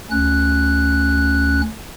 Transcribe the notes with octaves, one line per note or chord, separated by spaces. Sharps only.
D2 C#4 F#6